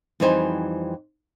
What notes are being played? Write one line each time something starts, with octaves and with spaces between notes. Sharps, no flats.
F2 E3 G3 D#4 C5 G#5